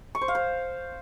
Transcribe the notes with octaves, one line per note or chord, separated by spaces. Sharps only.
C#6
C5
F5
C5